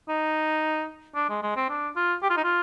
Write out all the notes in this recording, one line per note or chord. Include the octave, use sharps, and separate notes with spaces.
D#4
D4
G#3
G#3
C4
D4
F4
G4
F4
D#4
F4